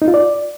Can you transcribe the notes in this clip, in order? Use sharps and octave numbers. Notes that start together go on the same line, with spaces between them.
D#4
F4
D5